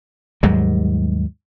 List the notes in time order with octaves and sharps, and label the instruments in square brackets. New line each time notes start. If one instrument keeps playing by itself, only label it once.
[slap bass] D#2 G#2 F#3 G3